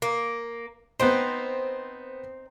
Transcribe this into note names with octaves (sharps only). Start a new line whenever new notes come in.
A#3
B3 C4 D#4 C5